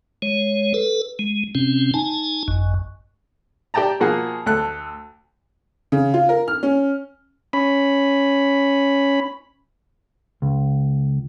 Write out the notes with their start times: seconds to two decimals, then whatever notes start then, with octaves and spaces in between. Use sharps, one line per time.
0.22 G#3 C#5
0.74 A4 B4
1.19 G#3
1.55 C3 C4 C#4
1.94 D#4 G#5 A5
2.48 G#1 F#2
3.74 G4 D5 G5 A5 A#5
4.00 B2 F3 A#3 F#4 G#4 F#5
4.46 D2 A4 F#6
5.92 C#3
6.14 F4
6.29 A#4
6.48 F6
6.63 C#4
7.53 C#4 B5
10.42 C#2